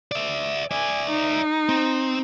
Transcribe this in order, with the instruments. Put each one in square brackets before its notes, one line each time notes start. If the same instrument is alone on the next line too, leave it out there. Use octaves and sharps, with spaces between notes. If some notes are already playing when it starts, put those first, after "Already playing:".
[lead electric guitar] D5 E5
[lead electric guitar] D5 E5 [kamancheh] G#5
[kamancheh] D#4
[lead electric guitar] C4